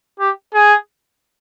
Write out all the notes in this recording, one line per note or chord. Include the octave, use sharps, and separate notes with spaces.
G4
G#4